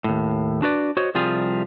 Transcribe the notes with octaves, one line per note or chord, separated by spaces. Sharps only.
D#2 A2
D4 F#4 B4 D5
F#4 C5 C#5 D#5
C2 C3 F3 G3 F4 G#4